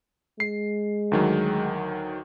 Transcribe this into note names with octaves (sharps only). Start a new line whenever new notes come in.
G#3 C7
D2 D#3 F#3